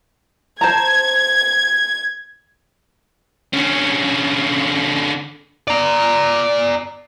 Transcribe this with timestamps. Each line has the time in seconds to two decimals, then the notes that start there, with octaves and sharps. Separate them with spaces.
0.61 C5 A5 A#5 G#6
3.53 D3 C#4
5.68 D5 A#5